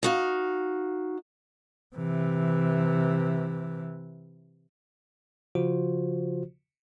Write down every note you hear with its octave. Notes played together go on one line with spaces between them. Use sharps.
D#4 F#4 F5
C3 E3
C#3 F3 F4 F#4 C5